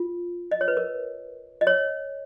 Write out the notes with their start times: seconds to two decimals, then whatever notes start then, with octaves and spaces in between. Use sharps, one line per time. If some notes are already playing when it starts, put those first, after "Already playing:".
Already playing: F4
0.51 D#5
0.61 C#5
0.68 B4
0.77 A#4
1.61 D#5
1.67 C#5